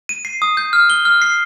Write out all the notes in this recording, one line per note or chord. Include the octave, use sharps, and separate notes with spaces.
D#7
C7
D#6
G6
F6
G7
F6
C7